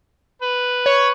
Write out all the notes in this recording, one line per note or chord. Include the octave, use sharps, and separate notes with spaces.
B4
C#5